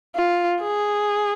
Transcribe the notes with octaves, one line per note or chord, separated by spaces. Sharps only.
F4
G#4